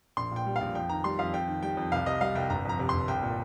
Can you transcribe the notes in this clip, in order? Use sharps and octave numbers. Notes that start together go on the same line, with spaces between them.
A#1 C6
A#2 G5
G3
A#1 F5
F2 G5
D#3 A#5
G3 C6
F2 F5
F2 G5
D#3
G3 G5
F2
C2 F5
C3 D#5
G3 F5
C2 G5
G1 A#5
F2 A#5
C3
G1 C6
C2 G5
A#2